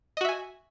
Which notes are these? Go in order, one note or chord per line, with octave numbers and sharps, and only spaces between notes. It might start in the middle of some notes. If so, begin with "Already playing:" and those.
F#4 D#5 E5 G#5